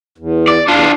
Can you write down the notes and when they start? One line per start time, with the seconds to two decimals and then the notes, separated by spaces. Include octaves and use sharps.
0.18 E2
0.48 D5
0.68 E2 D4 F4